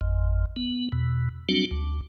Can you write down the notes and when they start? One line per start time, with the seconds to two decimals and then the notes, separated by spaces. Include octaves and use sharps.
0.01 G#1 F2
0.56 B3
0.92 E2 B2
1.49 F#3 G3 C4 D4 F#4
1.71 D2